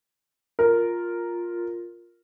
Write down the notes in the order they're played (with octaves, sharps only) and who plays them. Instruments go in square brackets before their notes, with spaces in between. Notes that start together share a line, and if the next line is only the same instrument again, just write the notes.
[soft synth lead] F4 [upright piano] A#4